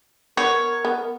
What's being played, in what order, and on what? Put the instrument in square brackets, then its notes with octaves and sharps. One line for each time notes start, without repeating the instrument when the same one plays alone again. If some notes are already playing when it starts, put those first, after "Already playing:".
[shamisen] B3 [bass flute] A#4 [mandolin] C#5
[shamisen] B3